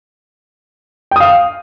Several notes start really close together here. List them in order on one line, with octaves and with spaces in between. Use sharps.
G5 D#6 F5